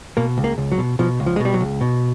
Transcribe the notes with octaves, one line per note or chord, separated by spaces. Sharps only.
B2 A#3
C#2
A#3
C#2
F#3
B2
B2 F3
C#2
F3
G#3
B2
G3
F#3
C#2
B2